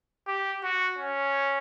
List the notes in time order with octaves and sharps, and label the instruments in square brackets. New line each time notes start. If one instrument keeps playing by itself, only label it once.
[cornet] G4
F#4
C#4